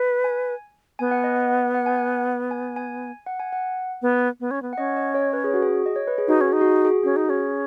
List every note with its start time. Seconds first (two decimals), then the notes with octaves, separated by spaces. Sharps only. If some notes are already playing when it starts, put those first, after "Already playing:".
Already playing: B4
0.24 G#5
0.99 B3 G#5
1.11 F#5
1.24 D#5
1.36 F#5
1.75 F#5
1.86 G#5
1.96 F#5
2.51 G#5
2.76 G#5
3.26 F#5
3.40 G#5
3.52 F#5
4.02 B3
4.40 B3
4.51 C#4
4.62 B3
4.73 F#5
4.77 C#4 D#5
4.97 D#5
5.14 C#5
5.33 B4
5.44 G#4
5.54 F#4
5.62 G#4
5.86 D#5
5.96 C#5
6.08 B4
6.18 G#4
6.28 D#4 F#4
6.41 C#4
6.48 G#4
6.53 D#4
6.61 F#4
6.66 G#4
6.85 G#4
7.03 C#4 F#4
7.16 D#4
7.29 C#4 G#4